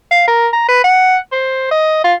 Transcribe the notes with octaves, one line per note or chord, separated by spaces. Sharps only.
F5
A#4
A#5
B4
F#5
C5
D#5
F4